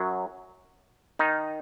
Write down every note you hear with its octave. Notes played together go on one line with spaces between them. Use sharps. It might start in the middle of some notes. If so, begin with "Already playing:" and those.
Already playing: F#2 F#3
D#3 D#4